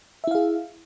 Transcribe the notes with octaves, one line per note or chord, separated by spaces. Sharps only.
E4 G#4 E5 F5